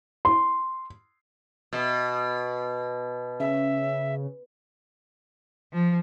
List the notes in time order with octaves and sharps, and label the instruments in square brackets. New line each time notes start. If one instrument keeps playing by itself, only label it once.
[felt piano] C6
[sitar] B2
[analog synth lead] C#3 [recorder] E5
[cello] F3